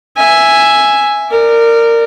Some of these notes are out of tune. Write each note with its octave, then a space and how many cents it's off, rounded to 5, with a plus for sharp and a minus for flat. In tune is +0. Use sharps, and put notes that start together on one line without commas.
E5 +0 G#5 +0
A#4 -15 D5 +15